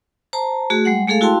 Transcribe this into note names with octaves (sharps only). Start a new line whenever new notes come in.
C5 A5 A#5
A3 F#4 G#4
G3 G#3 F#5
G#3 A3 G#4 A4 F5
E4 F#4 F5 G5 A5 C6